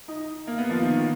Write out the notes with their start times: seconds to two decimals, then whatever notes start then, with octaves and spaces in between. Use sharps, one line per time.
0.08 D#4
0.47 A#3
0.58 B3
0.70 F3
0.82 D#3
0.94 D#3